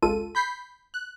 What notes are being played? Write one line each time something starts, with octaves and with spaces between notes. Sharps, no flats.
G#1 C#2 G#3 F4 A4 D#7
B5 G6 B6 C7
F#6